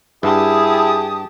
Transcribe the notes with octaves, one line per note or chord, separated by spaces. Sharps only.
G2 E4 G4 G#4 A5 D#6